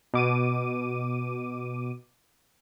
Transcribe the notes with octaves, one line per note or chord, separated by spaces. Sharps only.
B2 D6 D#7